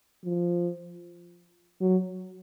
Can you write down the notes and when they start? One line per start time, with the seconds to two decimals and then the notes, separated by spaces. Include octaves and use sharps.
0.25 F3
1.81 F#3